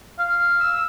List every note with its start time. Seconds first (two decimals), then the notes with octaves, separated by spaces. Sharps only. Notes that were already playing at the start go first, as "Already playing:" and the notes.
0.19 F5
0.60 E6